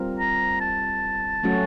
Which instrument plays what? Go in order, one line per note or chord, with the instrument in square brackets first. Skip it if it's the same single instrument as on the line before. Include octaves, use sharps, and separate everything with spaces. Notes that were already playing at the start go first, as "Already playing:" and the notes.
Already playing: [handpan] G3 C4 F4 A#4
[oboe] A#5
A5
[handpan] F#3 A3 C#4 F#4